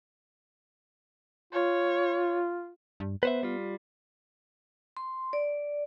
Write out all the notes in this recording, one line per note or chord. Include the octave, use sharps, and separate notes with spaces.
F4 C#5
G2
B3 B4 C5 E5
G3 F4
C6
D5